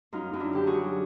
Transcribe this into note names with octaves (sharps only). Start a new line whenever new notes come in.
F#2 D#4 F4
F#2 D#4
D4 E4
D3 G4
F#4 G#4
F#3